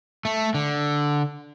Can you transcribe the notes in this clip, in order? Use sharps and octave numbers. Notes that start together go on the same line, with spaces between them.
A3
D3